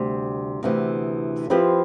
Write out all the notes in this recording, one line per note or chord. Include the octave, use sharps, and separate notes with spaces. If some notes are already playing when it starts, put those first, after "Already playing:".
Already playing: D2 C3 G3
D2 C3 E3 B3
F3 C4 E4 G4 B4